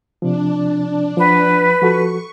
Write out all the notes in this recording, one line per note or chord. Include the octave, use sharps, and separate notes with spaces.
C3 F3 D4
F3 B4 F#5
F3 F#4 A4 C#6